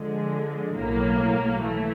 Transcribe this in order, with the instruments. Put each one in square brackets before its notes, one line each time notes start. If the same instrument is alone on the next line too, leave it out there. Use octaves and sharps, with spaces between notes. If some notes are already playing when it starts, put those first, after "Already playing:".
Already playing: [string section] D3 F3 G#3
B1 A2 F#3 A#3
E3 A3